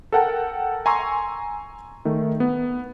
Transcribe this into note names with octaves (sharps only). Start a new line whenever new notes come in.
A4 A#4 F#5 G5 A5
G#5 A#5 C6 C#6 E6
D#3 A3
B3